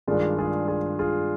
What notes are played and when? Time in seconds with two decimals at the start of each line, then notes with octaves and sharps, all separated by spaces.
0.07 G2 D#3 G#3 D4 F4 G#4
0.38 F4 G#4
0.68 F4 G#4
0.99 F4 G#4